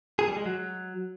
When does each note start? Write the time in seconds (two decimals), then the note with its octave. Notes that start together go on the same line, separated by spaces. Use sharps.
0.19 G#4
0.28 G3
0.37 G#3
0.46 F#3